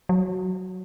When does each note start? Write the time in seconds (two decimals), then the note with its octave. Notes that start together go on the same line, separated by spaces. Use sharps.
0.09 F#3